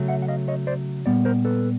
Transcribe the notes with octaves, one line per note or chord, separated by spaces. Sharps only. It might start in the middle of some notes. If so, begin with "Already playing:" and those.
Already playing: C#3 F#3 A3
E5 F#5
F#5
D#5 F5
C#5 D#5
C5 D5
A#2 G3 B3 D5
A#4 C5
A4 B4